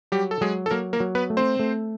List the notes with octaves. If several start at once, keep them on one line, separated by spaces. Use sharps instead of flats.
F#3 G3 G4
A4
F#3 G#3 G#4
A4
F#3 A#3 A#4
A#3 A#4
F#3
B3 B4
A3
C4 C5
A3